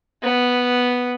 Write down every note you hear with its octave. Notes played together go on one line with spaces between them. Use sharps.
B3